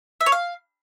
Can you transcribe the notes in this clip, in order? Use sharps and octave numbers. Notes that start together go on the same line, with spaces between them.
E5
C#5
F5